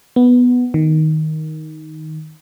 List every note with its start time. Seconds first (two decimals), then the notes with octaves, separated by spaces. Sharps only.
0.16 B3
0.74 D#3